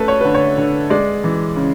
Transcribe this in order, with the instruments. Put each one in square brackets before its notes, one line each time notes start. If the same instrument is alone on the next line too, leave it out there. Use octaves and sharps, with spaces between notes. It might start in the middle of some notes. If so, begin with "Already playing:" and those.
Already playing: [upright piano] A3 C#4 A4 B4
C#5
D3 B4
C#5
D3
G#3 D5
E3
C#3